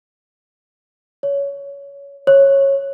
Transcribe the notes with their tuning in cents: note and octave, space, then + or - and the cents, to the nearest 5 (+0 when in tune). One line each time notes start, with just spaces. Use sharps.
C#5 +20
C#5 -15